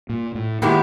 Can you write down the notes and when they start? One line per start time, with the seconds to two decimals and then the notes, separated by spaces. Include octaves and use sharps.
0.09 A#2
0.35 A2
0.62 A#2 D#3 G#3 B3 E4 G4